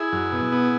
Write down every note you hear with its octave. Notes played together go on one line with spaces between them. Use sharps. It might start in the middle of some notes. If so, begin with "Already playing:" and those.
Already playing: E4 G#4
F#2
B2
B3